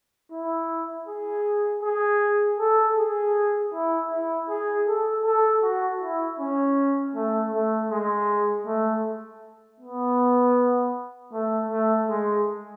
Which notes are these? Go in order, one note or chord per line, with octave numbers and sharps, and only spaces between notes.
E4
G#4
G#4
A4
G#4
E4
E4
G#4
A4
A4
F#4
E4
C#4
A3
A3
G#3
A3
B3
A3
A3
G#3